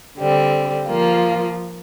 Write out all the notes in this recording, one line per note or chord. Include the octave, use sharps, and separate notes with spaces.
D3 G3 C4
F3 A#3 F4